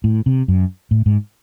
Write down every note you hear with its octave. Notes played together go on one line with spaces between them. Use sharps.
A2
C3
F#2
A2
G#2